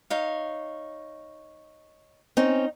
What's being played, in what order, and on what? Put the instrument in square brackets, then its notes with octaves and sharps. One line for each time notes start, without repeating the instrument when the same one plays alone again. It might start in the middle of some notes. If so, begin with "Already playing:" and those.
[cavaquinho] D#4 C#5 F5
[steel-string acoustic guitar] C4 C#4 [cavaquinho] D#4